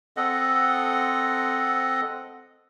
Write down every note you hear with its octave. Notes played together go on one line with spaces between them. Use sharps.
C4 A4 D#5 F#5